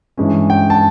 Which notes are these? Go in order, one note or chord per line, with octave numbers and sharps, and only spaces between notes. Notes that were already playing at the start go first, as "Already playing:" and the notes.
G2 E3 G#3 C#4
G5
A5